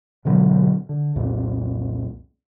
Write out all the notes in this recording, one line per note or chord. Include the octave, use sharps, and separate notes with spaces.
G#2 B2 D3 F#3
D3
C2 F2 A#2